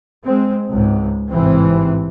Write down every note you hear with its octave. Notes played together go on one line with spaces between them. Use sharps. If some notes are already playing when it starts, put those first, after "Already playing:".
G#3 C4
C#2 G#2
A1 G#2 C3 E3 C4